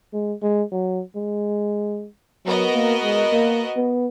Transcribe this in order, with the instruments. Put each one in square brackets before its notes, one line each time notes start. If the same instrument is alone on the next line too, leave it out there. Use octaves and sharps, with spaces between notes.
[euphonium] G#3
G#3
F#3
G#3
[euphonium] F#3 [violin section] B3 F#4 A#4 D#5
[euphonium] A#3
G#3
A#3
B3